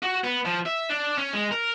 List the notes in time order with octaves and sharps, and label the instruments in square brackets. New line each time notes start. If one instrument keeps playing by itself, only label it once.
[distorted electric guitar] F#4
B3
F3
E5
D4
C#4
G#3
A#4